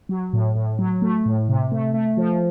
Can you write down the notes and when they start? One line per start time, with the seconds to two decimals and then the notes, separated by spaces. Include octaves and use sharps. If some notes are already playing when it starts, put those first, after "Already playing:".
0.09 F#3
0.33 A2
0.55 A2
0.79 F#3
1.02 A3
1.26 A2
1.48 C3
1.72 A3
1.94 A3
2.17 F3